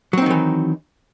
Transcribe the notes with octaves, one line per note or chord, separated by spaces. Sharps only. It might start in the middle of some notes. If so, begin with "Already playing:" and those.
D#3 E3 F#3 C4 D#4